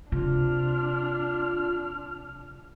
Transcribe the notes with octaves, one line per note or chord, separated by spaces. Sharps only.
C3 D4 F4 F6